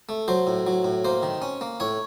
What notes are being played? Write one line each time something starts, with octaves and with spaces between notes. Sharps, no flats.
A3
F#3 C5
A2
F#3
A2
A#3 C5
D#3
C#4
A#3
A2 C#5